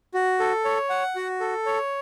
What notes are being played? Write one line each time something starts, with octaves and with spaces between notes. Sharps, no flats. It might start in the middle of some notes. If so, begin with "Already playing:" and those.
F#4
A4
C#5
F#5
F#4
A4
C#5